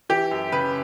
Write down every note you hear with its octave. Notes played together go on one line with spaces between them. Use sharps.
E3 G4
F#2
C#3 B4